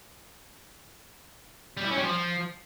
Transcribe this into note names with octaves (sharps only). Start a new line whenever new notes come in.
G3
E4
C#4
G3
F3